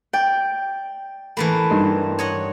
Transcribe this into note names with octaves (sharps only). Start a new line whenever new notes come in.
D5 G5
E3 A3 A#3 B5
G2 D#4 C6
C#5 D#5 F#5